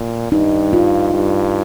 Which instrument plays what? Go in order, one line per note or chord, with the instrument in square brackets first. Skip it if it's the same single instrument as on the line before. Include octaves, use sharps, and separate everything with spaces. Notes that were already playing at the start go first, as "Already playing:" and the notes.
Already playing: [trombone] A#2
[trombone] G2 [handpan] D#4
[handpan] F4
[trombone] G2